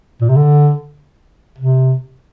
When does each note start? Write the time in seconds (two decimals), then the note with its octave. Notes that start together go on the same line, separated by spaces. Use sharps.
0.21 A#2
0.29 C3
0.36 D3
1.58 C3